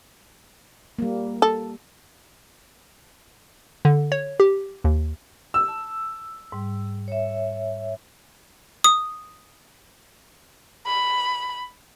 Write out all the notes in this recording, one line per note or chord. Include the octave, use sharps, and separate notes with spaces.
G3 A#3
A4
D3
C#5
G4
D#2
E6
A5
G#2 G3
C#5 E5
D#6
B5